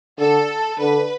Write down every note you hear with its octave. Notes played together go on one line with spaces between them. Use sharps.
D3 A4
D3 B4